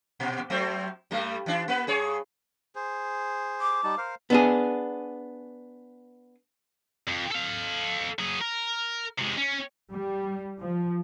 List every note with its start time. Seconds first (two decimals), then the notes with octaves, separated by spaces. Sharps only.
0.20 A#2
0.50 F#3 A3 C4
1.11 G2 G3 A3
1.46 E3 D4
1.68 A#3 B4
1.87 G2 G#4 C#5
2.75 G#4 C5
3.61 D6
3.84 G3 D#4 A5
3.98 A#4 C5 F5
4.30 B3 D4 G#4
7.07 F2
7.31 A4 F5
8.19 F#3 G#4
8.41 A#4
9.18 C3 G#3
9.37 C#4
9.91 G3
10.60 F3